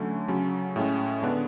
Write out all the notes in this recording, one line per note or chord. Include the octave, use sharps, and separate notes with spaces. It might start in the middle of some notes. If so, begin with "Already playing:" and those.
Already playing: D3 F#3 A3 C#4
C#3 F#3 C#4
A2 G#3 C#4
D3 G#3 B3 D4